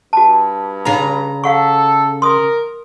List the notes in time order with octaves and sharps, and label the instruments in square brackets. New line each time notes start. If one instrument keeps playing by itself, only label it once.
[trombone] G2 [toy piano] F#4 A5
[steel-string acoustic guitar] C#3 A#5
[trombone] A4 [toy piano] F5 F#5 C#6
[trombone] A#4 [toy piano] C6 D#6